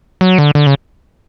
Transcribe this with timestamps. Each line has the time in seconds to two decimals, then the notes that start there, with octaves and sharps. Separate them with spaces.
0.21 F#3
0.38 D3
0.55 D3
0.67 C#3